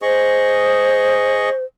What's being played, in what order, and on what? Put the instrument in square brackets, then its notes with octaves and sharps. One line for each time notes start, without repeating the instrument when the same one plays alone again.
[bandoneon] G#4 D#5 C#6 [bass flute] C5